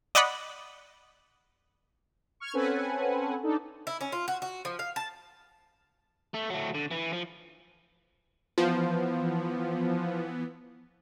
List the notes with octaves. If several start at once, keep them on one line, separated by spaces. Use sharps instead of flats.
D5 D#5 F#5 B5
C#6 F6 G#6
C4 C#4 A4 B4 F#5 G#5
D4 D#4 A4
E4
C#4
F4
F#4
F#4
F3
F5
A5
A3
F#3 A3
D3
E3
F3
E3 F3 B3